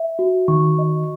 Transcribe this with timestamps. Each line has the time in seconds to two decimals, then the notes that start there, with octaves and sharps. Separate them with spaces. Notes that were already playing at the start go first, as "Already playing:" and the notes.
Already playing: E5
0.19 F#4
0.48 D#3 C#6
0.79 D#5